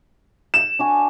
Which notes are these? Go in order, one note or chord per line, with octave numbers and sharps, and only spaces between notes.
E7
D4 F#4 G#5